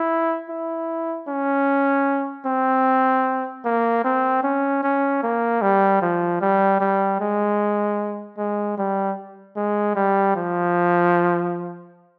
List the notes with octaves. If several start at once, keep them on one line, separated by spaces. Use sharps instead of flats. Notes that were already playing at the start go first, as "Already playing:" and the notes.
Already playing: E4
E4
C#4
C4
A#3
C4
C#4
C#4
A#3
G3
F3
G3
G3
G#3
G#3
G3
G#3
G3
F3